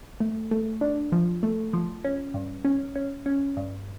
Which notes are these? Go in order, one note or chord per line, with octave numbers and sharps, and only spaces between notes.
A3
A3
D4
F3
A3
F3
C#4
G2
C#4
C#4
C#4
G2